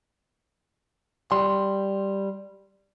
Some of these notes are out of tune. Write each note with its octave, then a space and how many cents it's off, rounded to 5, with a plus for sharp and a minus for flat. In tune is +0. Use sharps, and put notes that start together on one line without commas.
G3 +0 C6 +0